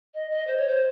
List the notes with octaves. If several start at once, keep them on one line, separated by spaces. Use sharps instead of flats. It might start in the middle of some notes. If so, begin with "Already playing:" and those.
D#5
D#5
C5
C#5
C5